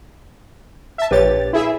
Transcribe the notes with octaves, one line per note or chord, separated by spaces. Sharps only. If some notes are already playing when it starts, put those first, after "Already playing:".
E5 A5
A#1 G4 B4 C#5 A6
E4 G#4 E5